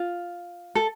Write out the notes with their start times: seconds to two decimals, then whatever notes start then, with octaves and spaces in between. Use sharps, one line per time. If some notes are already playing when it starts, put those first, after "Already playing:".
Already playing: F4
0.75 A4